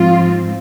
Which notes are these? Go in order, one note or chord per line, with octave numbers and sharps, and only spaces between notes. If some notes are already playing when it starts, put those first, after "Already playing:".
Already playing: G#2 F3 C4 F4